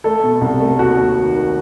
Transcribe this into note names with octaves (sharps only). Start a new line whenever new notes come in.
A3 A4
B2
C2
A3
D#2 F#4
D#2
D#3
D#3